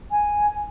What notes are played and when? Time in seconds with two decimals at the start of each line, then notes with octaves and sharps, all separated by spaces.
0.11 G#5